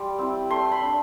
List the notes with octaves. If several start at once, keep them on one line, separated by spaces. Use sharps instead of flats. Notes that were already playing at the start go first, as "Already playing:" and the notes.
Already playing: G3 C6
C4 E4
A3 C6
B5
D4